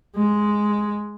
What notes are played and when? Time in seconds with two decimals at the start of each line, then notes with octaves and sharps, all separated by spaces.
0.16 G#3